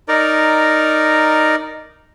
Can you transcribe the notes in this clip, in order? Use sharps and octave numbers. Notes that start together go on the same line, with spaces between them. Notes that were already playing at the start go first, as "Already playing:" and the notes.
D#4 A#4 D5